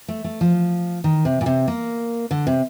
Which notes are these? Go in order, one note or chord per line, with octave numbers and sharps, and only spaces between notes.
A3
A3
F3
D#3
C3
A#2
C3
A#3
D3
C3